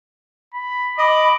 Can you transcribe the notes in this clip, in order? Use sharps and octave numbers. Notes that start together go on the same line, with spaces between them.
B5
D#5 B5 D6